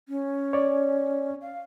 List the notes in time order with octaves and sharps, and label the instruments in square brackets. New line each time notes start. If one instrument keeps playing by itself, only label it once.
[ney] C#4
[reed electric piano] C#5 D5
[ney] F5